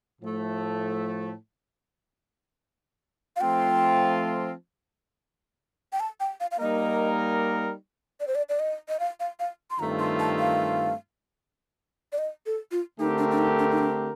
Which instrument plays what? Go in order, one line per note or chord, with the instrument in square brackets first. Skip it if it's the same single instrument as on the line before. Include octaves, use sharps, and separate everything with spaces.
[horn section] A2 F3 A3
[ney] F5
[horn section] F3 A3 C4 F4 [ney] G5
[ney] G5
A5
G5
F5
F5
[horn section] G3 A#3 D#4 A#4 [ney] D#5
[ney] D5
C5
D5
D5
D#5
D#5
F5
F5
F5
C6
[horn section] G2 D#3 A3 C4 F4 [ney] A#5
[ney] C6
A5
F5
D5
D#5
A4
F4
[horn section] D3 A3 C4 G4 A#4 [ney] D#4
[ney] D4
D4
D#4
D4
D#4
D4